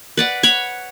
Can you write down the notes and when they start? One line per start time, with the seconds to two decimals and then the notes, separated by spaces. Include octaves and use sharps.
0.17 B4 D5 F#5
0.43 C#5 F#5 B5